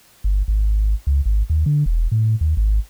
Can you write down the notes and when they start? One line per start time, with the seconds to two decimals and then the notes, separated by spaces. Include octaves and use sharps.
0.24 G1
0.48 G#1
1.07 C#2
1.26 G#1
1.50 D#2
1.66 D3
1.86 E1
2.12 A2
2.41 D#2
2.57 G#1